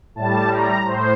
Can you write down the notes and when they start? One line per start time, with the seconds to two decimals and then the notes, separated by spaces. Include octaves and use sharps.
0.15 A2 G3 A5
0.50 A#5
0.85 A2 C5